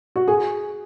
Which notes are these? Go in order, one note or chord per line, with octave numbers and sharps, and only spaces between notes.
F#4
G#4